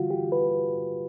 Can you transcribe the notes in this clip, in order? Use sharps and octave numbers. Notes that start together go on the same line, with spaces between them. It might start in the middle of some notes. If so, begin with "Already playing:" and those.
Already playing: D3 G3 F4 F#4
G4
B4